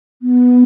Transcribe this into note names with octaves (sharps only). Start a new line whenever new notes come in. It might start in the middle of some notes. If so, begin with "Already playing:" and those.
B3